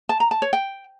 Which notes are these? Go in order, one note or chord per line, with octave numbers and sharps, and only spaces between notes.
A5
A#5
A5
C#5
G5